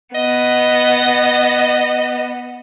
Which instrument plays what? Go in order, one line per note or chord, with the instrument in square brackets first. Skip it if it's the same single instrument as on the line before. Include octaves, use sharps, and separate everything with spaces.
[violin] B3 [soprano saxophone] D#5